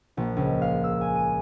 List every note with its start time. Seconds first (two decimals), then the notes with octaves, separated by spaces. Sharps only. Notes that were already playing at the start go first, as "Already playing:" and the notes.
0.17 A#1
0.37 C#2
0.62 F5
0.84 E6
1.01 G#5
1.16 D#7